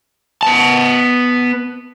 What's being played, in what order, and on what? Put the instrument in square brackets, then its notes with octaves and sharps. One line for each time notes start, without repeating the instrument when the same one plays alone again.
[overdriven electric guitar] B3 A5